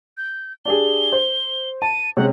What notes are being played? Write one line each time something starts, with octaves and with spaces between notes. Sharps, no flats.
G6
D4 G4 G#4 G7
C5
A5 D#7
C3 G#3 C#4 F#5